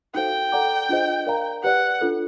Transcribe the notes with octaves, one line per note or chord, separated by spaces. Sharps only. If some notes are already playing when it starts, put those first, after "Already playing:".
D#4 F#4 A4 C5 F5 G5
A4 D5 F#5 A#5 D6
D4 F4 G#4 C5 D#5
A#4 D5 F5 A#5
G4 B4 D5 F#5
D4 F4 A4